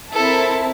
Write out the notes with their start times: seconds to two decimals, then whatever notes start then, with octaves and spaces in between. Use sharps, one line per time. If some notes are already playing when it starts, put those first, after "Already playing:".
0.14 C4 E4 A4 A#4 E5 A5